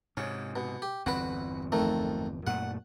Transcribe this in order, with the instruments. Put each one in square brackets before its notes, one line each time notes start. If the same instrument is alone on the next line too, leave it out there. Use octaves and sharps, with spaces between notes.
[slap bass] G#2 C3 [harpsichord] C#4
[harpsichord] B2
G4
[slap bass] G1 E2 C4 [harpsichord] F#4 B4
[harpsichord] F2 D#3 A3
[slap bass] F#2 A#2 A3 [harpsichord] F#5